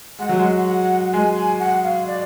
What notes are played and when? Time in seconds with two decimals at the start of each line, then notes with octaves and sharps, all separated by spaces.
0.19 G#3 F#5
0.29 F#3
0.39 G#3
0.66 F#5
1.13 G#3 G#5
1.36 G#5
1.59 F#5
1.83 F5
2.07 D5